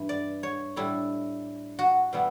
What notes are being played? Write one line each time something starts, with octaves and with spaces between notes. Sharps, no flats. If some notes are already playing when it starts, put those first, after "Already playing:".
Already playing: G2 E3 B4
D5
C#5
A2 G3 D4 E4
F#4
B2 G3 B3 E4